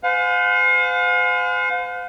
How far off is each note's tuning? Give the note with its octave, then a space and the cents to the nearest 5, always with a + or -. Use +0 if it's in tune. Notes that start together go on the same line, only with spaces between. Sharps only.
C5 -45 F5 +40 G#5 +0